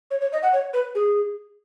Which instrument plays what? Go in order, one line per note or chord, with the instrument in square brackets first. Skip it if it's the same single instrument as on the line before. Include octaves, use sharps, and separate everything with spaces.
[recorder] C#5
C#5
D#5
F#5
C#5
B4
G#4